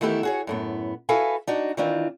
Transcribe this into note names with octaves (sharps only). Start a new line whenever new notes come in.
D#3 E3 A3 B3 E4 G4
F#4 G#4 C#5
F#2 A2 B3
E4 F#4 A4 B4 F5 G#5
D4 D#4 F#4
D#3 E3 C4 D4 F4